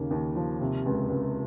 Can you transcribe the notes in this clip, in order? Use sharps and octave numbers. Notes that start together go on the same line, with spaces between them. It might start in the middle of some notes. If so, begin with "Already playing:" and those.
Already playing: D#2 C#3 A#3
D#2
F3
C3
C#2
C#2